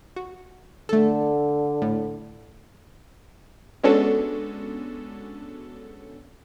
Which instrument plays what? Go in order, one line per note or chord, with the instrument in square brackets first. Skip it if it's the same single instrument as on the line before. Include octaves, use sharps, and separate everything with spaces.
[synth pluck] F#4
[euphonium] D3 [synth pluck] A3 A4
[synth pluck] A2
[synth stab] G#3 B3 C#4 D4 F#4 A4